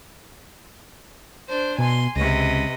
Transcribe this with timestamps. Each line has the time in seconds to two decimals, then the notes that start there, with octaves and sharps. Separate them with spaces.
1.48 D4 C5
1.78 B2 G#5 C6
2.16 C#2 C3 B4 D#5